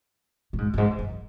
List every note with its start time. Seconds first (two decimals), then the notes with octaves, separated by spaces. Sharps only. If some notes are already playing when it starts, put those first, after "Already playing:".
0.53 A2
0.58 G#2
0.74 F#2
0.78 G#2
0.99 F#2